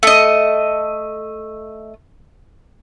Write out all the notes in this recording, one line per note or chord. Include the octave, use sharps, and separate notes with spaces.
A3 D#5